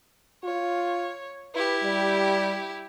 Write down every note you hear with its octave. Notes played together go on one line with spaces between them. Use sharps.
F4 C#5
E4 G4 B4
G3